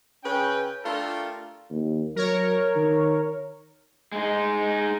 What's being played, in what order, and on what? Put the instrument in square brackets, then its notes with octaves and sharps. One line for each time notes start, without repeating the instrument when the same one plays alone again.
[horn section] C#3 C#4 B4 G5
A3 D4 F4 G4 A4 A#4
[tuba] D#2
[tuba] F#3 [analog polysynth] A#4 C#5
[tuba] D#3
[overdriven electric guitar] G#3 D#4